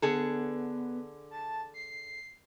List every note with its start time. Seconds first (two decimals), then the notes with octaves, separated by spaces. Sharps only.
0.02 D3 B3 G#4 A4
1.31 A5
1.74 C7